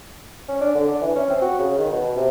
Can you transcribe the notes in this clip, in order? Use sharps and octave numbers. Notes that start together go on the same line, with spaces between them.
C#4
D4
D3
D4
E3
C#4
C4
F#4
C#3
D#3
B2
C3